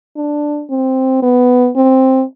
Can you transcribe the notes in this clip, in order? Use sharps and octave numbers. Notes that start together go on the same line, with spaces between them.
D4
C4
B3
C4